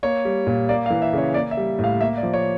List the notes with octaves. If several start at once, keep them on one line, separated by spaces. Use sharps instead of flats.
A#3 C#5
G3
A#2
A#3 D5
F5
E3
E5
C#3 C#5
A#3 D5
E5
G3
A2
F5
A#3 E5
D5
F3
C#5